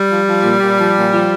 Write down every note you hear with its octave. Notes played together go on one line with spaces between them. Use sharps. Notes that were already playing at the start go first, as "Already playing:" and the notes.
Already playing: G3
F3
F3
A#2
A#2
F3
A#2
F3